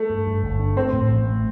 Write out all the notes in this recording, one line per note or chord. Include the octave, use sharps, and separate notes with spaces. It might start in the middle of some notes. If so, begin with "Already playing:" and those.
Already playing: A3
G2
G2
G1
D4
A3 C4
A2
A1
A3